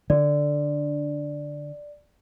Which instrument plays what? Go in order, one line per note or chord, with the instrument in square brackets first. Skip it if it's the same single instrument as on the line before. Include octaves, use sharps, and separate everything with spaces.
[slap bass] D3 [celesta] D5